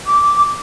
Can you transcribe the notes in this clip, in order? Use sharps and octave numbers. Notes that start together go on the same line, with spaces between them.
D6